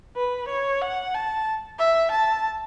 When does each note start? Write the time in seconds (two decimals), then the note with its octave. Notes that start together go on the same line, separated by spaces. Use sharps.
0.17 B4
0.48 C#5
0.82 F#5
1.14 A5
1.79 E5
2.12 A5